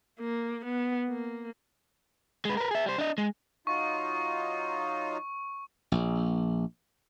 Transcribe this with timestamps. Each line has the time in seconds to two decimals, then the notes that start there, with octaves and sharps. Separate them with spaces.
0.20 A#3
0.65 B3
1.09 A#3
2.45 G#3 B4
2.57 A#4 B4
2.71 G#4 E5
2.86 G3 C5
2.98 D4 D#5
3.18 G#3
3.67 F#3 D#4 F4 C#6
5.92 A#1